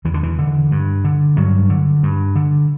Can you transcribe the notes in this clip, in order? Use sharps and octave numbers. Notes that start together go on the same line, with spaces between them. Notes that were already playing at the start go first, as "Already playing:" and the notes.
E2 E3
D3
E3
D3
G2
D3
G2 F#3
D3
G2
D3